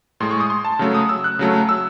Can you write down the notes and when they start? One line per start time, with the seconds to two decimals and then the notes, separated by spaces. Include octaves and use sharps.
0.20 A2 G#3 C6
0.31 C#6
0.40 D#6
0.50 C6
0.65 A5
0.79 C#3 F#3 A3
0.94 D#6
1.09 E6
1.24 F#6
1.39 C#3 F#3 A3
1.69 E6